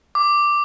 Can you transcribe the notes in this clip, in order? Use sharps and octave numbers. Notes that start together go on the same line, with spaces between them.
D6